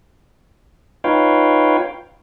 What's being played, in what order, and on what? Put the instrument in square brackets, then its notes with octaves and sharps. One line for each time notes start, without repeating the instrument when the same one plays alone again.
[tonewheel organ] D#4 F4 B4 C#5 F5 G5